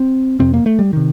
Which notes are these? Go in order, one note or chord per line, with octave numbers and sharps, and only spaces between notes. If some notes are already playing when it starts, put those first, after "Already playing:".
Already playing: C4
F2 C3 C4
A#3
A3
G3
C3 D#3